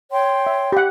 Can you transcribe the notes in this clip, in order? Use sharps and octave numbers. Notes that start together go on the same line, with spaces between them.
C#5 G5 C6
E5
G4 F#5